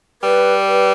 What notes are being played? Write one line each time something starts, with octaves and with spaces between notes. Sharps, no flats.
G3 B4
B4